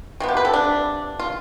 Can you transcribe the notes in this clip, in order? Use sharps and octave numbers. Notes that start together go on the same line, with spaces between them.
C3 F3 B3
G4
B4
A4
D4
F4